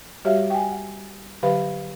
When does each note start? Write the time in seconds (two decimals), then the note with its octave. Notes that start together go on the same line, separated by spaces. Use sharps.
0.25 G3 F#4 G4 C#5 E5 F5
0.50 G5 G#5
0.72 F#5
1.43 D3 F#3 G4 B4 F5 B5